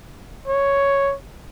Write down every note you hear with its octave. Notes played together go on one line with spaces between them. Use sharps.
C#5